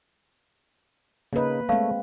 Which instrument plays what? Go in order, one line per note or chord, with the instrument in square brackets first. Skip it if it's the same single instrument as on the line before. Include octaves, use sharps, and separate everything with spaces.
[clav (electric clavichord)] C#3 D#4 [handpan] A#3 B4
[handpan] G#3 C4 [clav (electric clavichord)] A3 C#5 [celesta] F5